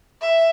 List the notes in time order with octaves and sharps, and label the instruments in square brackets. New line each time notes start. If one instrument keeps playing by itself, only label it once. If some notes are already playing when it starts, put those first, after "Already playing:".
[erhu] E5